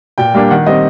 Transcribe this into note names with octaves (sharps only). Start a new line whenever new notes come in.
A#2 G5
G3 A#3 D4
D#3 F#5
G3 C4 D#5